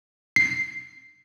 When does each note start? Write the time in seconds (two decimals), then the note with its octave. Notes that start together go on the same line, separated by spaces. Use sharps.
0.36 C7